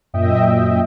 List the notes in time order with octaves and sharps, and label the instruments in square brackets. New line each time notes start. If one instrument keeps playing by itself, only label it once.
[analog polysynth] F#2 A#2 D#5 E5 G5